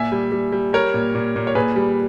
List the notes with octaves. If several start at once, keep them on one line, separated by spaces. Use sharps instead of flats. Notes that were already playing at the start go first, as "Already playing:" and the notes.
Already playing: A#2 E5 G#5
G3
G3
G3
G3 A#4 C#5
A#2
A#2
A#2
C#5
A#2 G#4 B4
G3